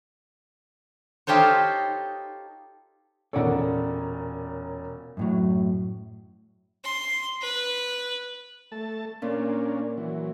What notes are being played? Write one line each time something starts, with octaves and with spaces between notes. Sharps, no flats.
D#4 F4 G4 A4 C5 C#5
E1 A#2 C#4 A4 D5 F#5
F#2 A2 F#3
C6
B4
A3 A5
A#2 A#3 C#4 D4
E3 F#3